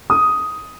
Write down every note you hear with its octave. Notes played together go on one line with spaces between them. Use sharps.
D#6